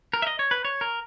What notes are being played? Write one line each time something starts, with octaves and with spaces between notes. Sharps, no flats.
A#4
E5
D#5
C#5
B4
C#5
A#4